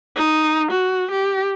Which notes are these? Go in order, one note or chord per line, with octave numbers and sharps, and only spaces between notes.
D#4
F#4
G4